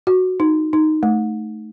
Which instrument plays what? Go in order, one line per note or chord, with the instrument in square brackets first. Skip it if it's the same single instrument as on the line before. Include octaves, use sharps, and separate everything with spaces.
[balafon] F#4
D#4
D#4
A3